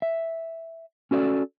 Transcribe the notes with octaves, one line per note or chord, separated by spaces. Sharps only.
E5
C#4 F#4 A4 C#5 D5